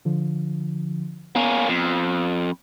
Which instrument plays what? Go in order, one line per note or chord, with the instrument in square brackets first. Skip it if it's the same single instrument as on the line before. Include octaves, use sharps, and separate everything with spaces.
[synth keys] D3 F3
[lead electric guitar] A#3 C#4 [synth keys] B3
[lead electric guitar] F2